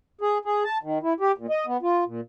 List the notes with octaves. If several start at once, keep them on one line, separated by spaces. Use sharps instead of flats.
G#4
G#4
A5
D#3
E4
G4
A#2
D#5
B3
F4
A#2